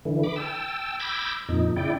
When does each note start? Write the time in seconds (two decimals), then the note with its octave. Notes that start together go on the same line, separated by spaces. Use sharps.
0.05 D3 E3
0.23 B5 D6
0.36 G5 A5 E6
1.00 B5 D6 E6 G6 G#6 A#6
1.49 F2 A#2 D#4
1.76 C#3 E4 D5 G5